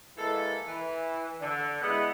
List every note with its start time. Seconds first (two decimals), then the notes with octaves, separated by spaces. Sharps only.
0.17 E3 G#3 A#3 A4
0.68 E3
1.41 D3
1.81 G#3 B3 E4 D#5 F#5